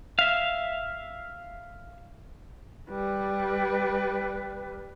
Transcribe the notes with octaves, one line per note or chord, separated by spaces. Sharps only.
E5 F5
G3 B4